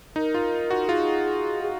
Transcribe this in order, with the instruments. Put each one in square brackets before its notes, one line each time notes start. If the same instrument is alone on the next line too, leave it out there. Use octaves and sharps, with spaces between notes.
[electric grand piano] D#4 [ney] A#4
[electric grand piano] F4
F#4
[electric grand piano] F4 [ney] G#4
[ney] G#4